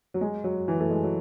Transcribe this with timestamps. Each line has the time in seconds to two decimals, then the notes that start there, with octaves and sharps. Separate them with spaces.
0.14 F#3
0.21 G#3
0.44 F#3
0.68 E3
0.80 A3
0.90 G#3
1.03 F#3